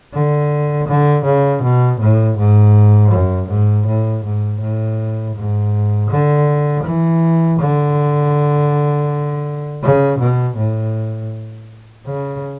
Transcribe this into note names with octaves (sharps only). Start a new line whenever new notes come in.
D3
D3
C#3
B2
A2
G#2
F#2
G#2
A2
G#2
A2
G#2
D3
E3
D3
C#3
B2
A2
C#3